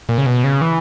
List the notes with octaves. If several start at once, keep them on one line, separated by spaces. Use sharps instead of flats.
A#2
C#3
B2
C#3
E3